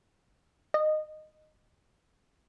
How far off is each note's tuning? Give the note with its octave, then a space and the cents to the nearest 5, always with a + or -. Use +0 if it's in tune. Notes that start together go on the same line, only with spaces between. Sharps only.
D#5 -15